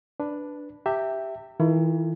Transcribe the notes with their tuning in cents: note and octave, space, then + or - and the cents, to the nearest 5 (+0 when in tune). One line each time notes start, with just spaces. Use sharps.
D4 +0 B4 +0
G4 +0 E5 +0 A#5 -40
E3 -40 E4 +45 A4 +30